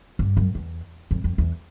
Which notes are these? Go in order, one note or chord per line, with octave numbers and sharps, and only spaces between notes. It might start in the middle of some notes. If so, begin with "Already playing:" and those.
G2
F#2
E2
F2
F2
E2